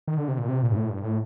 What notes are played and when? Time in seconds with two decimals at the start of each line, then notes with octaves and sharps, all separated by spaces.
0.08 D#3
0.18 D3
0.28 C3
0.38 A#2
0.49 C3
0.63 A#2
0.72 G2
0.76 A2
0.90 G2
1.04 A2